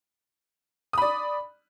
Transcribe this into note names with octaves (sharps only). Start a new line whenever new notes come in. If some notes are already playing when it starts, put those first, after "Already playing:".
D5 B5 D#6